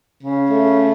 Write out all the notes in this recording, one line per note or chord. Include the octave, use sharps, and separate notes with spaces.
C#3
A3